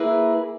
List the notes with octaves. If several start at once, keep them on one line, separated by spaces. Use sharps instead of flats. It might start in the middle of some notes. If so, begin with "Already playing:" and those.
Already playing: A#3 E4 G#4 B4